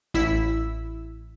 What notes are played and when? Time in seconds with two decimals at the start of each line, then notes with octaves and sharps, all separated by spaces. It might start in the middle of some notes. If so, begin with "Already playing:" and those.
0.14 A1 E4 E6 B6